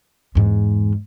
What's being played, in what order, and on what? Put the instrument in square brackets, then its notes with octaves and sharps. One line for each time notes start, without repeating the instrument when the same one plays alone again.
[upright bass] E2 G#2